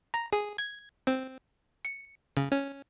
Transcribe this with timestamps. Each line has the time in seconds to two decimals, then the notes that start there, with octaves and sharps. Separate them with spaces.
0.14 A#5
0.33 G#4
0.58 G#6
1.07 C4
1.85 C#7
2.37 C#3
2.52 C#4